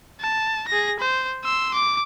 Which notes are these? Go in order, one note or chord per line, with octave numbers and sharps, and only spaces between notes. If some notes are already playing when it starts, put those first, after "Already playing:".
A5
G#4 A#6
C5
C6 E6
D6